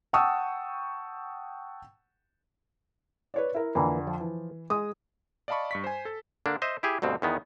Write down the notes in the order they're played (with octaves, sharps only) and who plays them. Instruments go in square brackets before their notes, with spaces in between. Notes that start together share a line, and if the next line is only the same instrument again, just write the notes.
[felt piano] F#5 G5 A5 C#6 D#6 E6
B4 C#5 D5
E4 A#4
[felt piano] F2 D3 [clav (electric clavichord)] E3 A#3
[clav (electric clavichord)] F3
[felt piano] E3
[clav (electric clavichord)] G#3 [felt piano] D#6
[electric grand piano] D5 D#5 F5 A5 B5 C#6
G2 C#6 B6
C5 G#5
A4
[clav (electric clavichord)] D3 A#3 D4
C5 D#5 E5
E4 G4 G#4
D2 G2 B2 C4
E2 D#3 B3